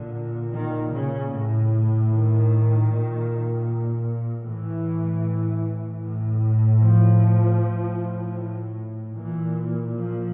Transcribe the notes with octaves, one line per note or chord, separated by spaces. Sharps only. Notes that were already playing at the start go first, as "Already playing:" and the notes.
Already playing: A#2 D3
D#3
C#3
A2
D#3
A#2
A2 E3
A2
F3
A2
A#2 E3
F3